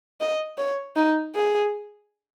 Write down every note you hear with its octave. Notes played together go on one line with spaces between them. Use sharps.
D#5
C#5
D#4
G#4